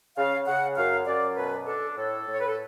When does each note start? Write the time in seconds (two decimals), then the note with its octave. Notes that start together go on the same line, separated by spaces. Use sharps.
0.18 C#3 F5
0.47 C#3 F#5
0.77 F#2 F5
1.07 F#2 D5
1.37 B2 B4
1.66 D4 A4
1.96 A2 A4
2.26 A2
2.33 C#5
2.41 B4
2.48 A4